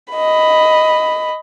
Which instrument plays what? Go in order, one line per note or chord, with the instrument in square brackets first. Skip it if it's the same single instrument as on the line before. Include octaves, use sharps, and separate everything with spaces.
[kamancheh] D#5 B5